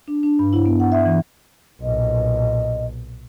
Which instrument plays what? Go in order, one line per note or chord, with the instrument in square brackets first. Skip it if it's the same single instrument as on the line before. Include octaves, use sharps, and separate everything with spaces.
[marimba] D4
D4
G2
E4
B3
F#5
E5
E3
[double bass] B1 A#2 [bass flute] D#5